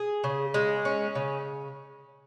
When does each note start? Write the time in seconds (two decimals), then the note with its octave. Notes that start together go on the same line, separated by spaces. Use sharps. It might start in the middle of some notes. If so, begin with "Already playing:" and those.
Already playing: G#4
0.24 C#3
0.54 G#3
0.85 C#4
1.15 C#3